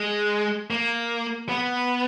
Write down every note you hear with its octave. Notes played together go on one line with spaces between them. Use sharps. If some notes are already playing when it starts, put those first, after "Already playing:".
Already playing: G#3
A#3
B3